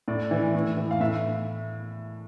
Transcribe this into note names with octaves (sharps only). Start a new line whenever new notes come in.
A2 D5
E3
A2
E3
F5
A2 E5